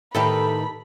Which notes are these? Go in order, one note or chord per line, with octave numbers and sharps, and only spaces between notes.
A2 D#3 G4 A4 B4 B5